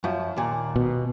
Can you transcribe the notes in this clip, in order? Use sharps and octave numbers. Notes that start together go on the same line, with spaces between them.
F#2 F3
D#2 A#2
B2